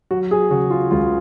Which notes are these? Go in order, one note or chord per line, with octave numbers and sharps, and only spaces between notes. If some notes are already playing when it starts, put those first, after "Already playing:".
F#3 F#4
G#4
C#3 F#4
F4
C#2 F4